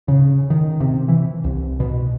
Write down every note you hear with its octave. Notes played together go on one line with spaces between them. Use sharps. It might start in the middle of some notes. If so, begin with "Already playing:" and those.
C#3
D#3
C3
E3
C2
B2